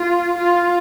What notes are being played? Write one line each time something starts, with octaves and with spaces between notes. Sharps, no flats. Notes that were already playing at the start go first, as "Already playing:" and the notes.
Already playing: F4
F4